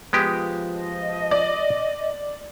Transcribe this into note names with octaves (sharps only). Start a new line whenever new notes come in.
F3 G#3 B3 G4
D#5
D5